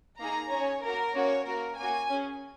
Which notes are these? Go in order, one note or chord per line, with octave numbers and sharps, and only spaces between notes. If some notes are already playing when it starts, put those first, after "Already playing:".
A#3 D#4 G#4 A#5
C#4 G#4 C#5
A#3 F#4 A#4
A#3 C#4 F#4 C#5
A#3 F#4 A#4
A#3 C#4 F#4 G#5
C#4 G#4